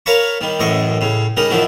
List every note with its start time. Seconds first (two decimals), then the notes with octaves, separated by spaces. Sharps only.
0.06 A#4 C#5 F5 A5 B5 C#6
0.41 D#3 G3
0.60 A1 F#2 A2 D#5 C#6
1.01 A2 C#3
1.37 C#3 G3 D#4 A#4
1.50 F#2 D#3 F3 F#3 E4